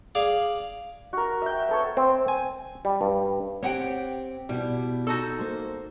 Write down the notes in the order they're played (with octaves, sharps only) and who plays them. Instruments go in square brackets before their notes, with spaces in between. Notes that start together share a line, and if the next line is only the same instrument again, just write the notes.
[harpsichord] G#4 D5 F5
[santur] F#4 A#4
E5 G5
B3 A4 C#5
[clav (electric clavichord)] C4
G#5
G3
G2
[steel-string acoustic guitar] C4 G4 [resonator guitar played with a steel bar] C#5 F#5 G5
[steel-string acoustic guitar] B2 E4 [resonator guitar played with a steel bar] G3
[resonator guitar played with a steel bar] D#4 F#4 A4
[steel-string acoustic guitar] A#3 C5